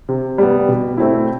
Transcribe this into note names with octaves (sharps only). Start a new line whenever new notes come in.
C3
G3 B3
B2
A3 C4 E4